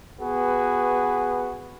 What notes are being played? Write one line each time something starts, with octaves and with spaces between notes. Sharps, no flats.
B3 F#4 G#4 B4